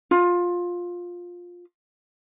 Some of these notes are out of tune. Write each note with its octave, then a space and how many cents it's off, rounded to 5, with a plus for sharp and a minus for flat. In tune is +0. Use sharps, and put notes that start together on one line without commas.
F4 +15